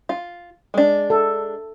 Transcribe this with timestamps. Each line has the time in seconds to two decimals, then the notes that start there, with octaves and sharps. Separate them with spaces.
0.09 F4
0.74 G#3 D4
1.10 A4